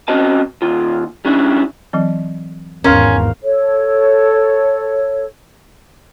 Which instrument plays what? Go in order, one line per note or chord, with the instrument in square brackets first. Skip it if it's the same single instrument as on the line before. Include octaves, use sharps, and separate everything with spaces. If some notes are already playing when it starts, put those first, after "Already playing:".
[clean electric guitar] C4 C#4 F#4 C5 D#5 A5
D#2 F4
G3 C#4 D4 E4
[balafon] E3 F#3 C4
[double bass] G#1 E2 [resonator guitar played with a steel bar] C#4 [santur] A#4 C5 F5
[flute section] A4 C#5